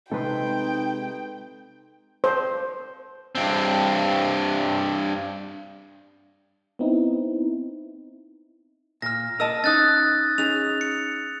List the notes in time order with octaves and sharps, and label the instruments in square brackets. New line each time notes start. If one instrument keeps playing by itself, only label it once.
[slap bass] C3 G#3 C4 [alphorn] D#4 [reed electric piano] A4 B4 C6 [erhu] G5
[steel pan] C5
[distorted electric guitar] G2 C4
[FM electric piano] B3 C4 D#4 E4
[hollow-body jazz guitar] A#2 [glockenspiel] F6 A#6
[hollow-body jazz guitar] A#4 D#5 A5 [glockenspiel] E6
[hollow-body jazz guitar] C#4 D#4 [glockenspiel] D#6 F#6 A6
[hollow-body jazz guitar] C#4 D#4 G#4 [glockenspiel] F7
[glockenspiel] C#7